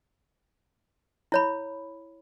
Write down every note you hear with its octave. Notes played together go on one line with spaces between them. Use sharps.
E4 C#5 B5